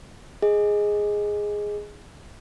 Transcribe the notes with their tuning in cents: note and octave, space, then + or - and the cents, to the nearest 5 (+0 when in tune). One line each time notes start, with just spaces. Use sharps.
G#4 +0 D#5 +0